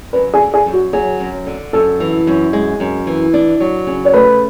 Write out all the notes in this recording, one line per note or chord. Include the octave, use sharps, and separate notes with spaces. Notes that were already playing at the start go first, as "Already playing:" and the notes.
F#2 B4
G#4
D3
G#4
F#2
F#4
F#3 G#4
F#2
D3
F#2 A4
E3
F#2
G#3
F#2
E3
D4
F#3
C#3
C#5
A3 B4